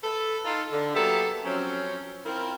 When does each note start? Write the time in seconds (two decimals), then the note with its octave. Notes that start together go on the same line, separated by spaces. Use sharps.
0.04 A4 B4
0.45 D#4 F4 A4
0.72 D3
0.95 F#3 A#3 B3 G4 A4 E5
1.45 F3 F#3 C4 C#4
2.25 C4 E4 F4 A#4